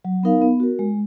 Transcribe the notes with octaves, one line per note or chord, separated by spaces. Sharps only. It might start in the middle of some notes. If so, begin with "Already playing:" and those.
F#3
B3 D#4 A#4 F5
B3
F#4 A#4
G#3